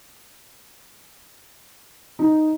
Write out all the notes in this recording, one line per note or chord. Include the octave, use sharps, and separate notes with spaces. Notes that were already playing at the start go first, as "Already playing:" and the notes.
D#4